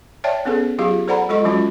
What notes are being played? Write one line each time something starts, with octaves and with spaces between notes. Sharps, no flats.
C#5 D5 E5 G5 A5
B3 C#4 G#4 A4 B4
F#3 F4 G4 G#4 F5
A4 C5 D5 F#5 A#5 B5
G#3 F4 A4 D#5 C#6
F3 F#3 G#3 C#4 F4 F#4